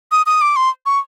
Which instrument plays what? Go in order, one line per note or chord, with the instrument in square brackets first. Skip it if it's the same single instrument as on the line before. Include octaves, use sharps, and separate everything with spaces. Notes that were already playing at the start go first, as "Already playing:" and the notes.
[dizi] D#6
D#6
D6
C6
C#6